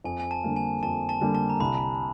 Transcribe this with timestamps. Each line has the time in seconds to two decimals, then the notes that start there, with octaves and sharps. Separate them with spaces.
0.04 F2 G#5
0.20 G#5
0.31 A5
0.44 D3 G3 A#3
0.56 G#5
0.83 F2 A5
1.09 A5
1.21 D3 G3 A#3
1.35 A5
1.49 A#5
1.60 C2 B5